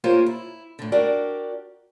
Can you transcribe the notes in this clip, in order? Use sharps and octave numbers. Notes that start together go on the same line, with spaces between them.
A#3 F4 G4 A#4 C5 C#5
E4
A2 D3
D4 F#4 G4 A#4 D5